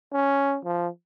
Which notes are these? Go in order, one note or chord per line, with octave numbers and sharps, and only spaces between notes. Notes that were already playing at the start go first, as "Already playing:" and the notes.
C#4
F3